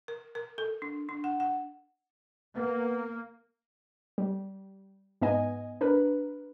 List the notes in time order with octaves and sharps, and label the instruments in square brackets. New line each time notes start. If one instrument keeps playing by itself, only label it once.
[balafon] A#4
A#4
A4
D4
D4
F#5
F#5
[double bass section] A#3 [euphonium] B3
[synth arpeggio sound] G3
G#2 B3 D#5 G#5
D4 A#4 B4